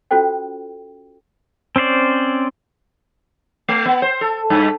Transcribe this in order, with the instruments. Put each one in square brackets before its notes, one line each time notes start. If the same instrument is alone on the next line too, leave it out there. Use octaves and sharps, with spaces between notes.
[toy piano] C#4 F4 F#4 A4 C5 G5
[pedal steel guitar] C4 C#4 C5 D5
[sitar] A3
B3
C5
A4
G2